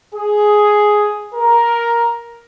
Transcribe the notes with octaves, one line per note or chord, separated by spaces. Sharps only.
G#4
A#4